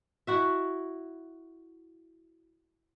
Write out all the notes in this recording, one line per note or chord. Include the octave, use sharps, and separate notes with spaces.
E4 F#4 E5